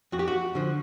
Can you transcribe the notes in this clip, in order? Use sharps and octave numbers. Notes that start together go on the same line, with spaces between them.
F2 F#4
G4
F#4
D3 F3